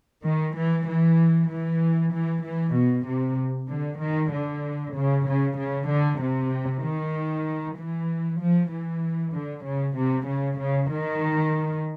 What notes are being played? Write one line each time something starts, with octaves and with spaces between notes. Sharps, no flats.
D#3
E3
E3
E3
E3
E3
B2
C3
D3
D#3
D3
C#3
C#3
C#3
D3
C3
D#3
E3
F3
E3
D3
C#3
C3
C#3
C#3
D#3